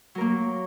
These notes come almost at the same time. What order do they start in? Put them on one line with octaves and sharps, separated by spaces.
F#3 A#4 A#3